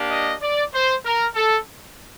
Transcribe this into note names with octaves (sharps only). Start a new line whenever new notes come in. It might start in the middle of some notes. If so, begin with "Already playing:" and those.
Already playing: A#3 D4 G4
D#5
D5
C5
A#4
A4